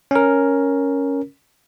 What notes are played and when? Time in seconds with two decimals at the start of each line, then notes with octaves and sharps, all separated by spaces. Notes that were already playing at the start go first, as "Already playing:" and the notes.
0.11 C#4 A#4